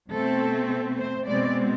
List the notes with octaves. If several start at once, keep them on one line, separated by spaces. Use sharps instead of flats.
B2 A3 C4 A4
C5
B2 G#3 C4 D5